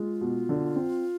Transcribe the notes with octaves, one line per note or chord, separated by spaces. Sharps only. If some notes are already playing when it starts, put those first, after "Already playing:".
Already playing: G#3 F4
B2
D3
C4